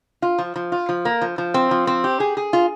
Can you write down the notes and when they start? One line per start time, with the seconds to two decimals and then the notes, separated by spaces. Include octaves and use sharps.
0.22 F4
0.39 F3
0.56 F3
0.72 F4
0.89 F3
1.05 A#3
1.22 F3
1.38 F3
1.54 C4
1.71 F3
1.87 C4
2.04 G4
2.20 G#4
2.37 G#4
2.53 F4